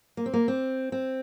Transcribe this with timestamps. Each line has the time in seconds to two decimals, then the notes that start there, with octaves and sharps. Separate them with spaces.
0.17 A#3
0.26 C4
0.34 A#3
0.48 C4
0.92 C4